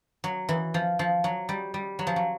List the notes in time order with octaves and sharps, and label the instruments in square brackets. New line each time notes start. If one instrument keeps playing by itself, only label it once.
[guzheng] F#3
E3
F3
F3
F#3
G3
G3
F#3
F3
F#3